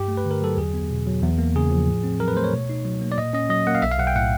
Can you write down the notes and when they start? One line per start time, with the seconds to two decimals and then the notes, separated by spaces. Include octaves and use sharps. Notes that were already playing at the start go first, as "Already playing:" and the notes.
Already playing: G2 G4
0.08 A3
0.17 B4
0.25 D3
0.31 A#4
0.42 F#3 A4
0.57 E2 G#4
0.74 B3
0.91 B2
1.06 F#3
1.23 E2
1.38 A#3
1.56 C#3 G#4
1.71 F3
1.87 A2
2.04 C4
2.20 F#3 A#4
2.28 B4
2.36 A3 C5
2.44 C#5
2.53 B2
2.69 D#4
2.85 F#3
3.01 A#3
3.12 D5
3.18 A#2 D#5
3.33 C#4 D#5
3.50 F#3 D#5
3.67 A#3 F#5
3.75 F5
3.82 B1 E5
3.91 F5
3.99 B1 F#5
4.07 G5
4.15 A2 F#5